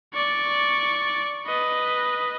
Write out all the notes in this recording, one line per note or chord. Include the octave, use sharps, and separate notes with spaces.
D5 C#6
B4 D#5